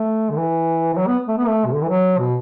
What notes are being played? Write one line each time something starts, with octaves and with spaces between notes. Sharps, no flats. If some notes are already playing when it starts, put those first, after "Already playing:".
Already playing: A3
D3
E3
E3
F#3
B3
A3
B3
A3
B2
D3
E3
F#3
B2